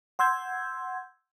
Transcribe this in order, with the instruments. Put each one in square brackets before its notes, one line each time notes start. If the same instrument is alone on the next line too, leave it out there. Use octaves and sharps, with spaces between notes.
[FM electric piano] F#5 C6 E6 G6 G#6